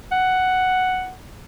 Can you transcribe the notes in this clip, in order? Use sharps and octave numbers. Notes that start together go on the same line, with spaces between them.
F#5